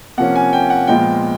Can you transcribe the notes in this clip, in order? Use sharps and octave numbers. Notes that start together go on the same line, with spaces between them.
C3 F3 A#3 C#4 F#5
G#5
G5
F#5
A#2 F3 G#3 B3 G5